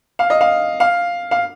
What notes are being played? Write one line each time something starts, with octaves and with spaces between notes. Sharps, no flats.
F5
D#5
F5
F5
F5